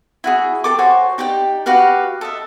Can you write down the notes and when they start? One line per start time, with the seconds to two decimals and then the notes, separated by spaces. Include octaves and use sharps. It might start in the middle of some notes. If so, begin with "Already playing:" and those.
0.24 E4 F#4 G#4
0.64 G4 A4 D6
0.79 F#4 C5 C#5 G#5
1.18 D#4 G4 D5 G5
1.66 F#4 G4 B4 F5
2.21 A4 D#5 E5